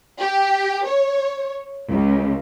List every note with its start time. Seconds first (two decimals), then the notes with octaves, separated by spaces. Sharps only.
0.19 G4
0.86 C#5
1.90 C#2